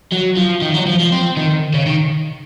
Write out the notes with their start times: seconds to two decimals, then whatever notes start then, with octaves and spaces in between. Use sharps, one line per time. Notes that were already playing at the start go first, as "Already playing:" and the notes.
0.12 F#3
0.37 F3
0.61 D#3
0.74 F#3
0.86 F3
1.00 F3
1.12 C4
1.37 D#3
1.74 C#3
1.86 D#3